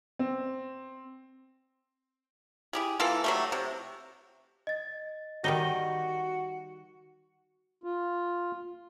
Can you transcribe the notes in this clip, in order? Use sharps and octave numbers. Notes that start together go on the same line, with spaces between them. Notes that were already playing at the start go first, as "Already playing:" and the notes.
C4
E4 G4 G#4
E3 A#3 F4 A4
F#3 G3 A3
C3
D#5 A6
D#3 G3 D#4 F#4 A#6 G7
F4